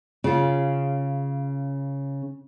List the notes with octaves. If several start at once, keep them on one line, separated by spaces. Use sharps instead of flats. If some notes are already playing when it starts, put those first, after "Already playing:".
C#3 F4